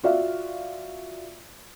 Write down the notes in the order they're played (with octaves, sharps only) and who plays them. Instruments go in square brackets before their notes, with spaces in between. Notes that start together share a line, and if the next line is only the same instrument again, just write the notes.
[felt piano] F4 F#4 D5 E5 F5